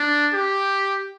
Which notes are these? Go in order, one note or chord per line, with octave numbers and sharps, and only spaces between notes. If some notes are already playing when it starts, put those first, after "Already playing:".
Already playing: D4
G4